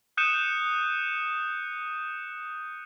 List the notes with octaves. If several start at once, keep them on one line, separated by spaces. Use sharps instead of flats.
D#6 F#6 G6 C#7 D#7 E7